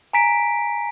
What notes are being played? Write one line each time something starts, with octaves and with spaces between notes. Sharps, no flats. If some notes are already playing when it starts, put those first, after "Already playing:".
G#5 A#5 B6 D7